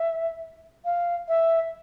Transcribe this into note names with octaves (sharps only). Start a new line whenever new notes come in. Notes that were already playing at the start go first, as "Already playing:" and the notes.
Already playing: E5
F5
E5